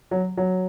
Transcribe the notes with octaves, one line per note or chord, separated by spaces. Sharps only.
F#3
F#3